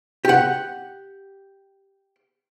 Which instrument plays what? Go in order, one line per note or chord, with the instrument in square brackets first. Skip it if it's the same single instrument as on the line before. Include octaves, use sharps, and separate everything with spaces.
[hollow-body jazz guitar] G4 F#5